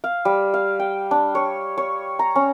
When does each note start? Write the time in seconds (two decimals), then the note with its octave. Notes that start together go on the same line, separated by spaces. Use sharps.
0.04 F5
0.25 G3
0.54 F5
0.80 G5
1.11 D4
1.35 C#5
1.78 C#5
2.19 A#5
2.35 C#4